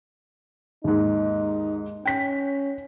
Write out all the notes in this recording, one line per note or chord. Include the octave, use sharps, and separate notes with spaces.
D#2 G#2 D#4
C#4 G5 B6